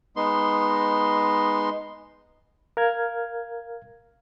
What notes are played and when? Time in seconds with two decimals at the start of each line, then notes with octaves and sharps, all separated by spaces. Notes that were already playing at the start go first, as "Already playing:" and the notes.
0.16 G#3 B3 D#4 C6
2.77 A#4 F5 F6 G#6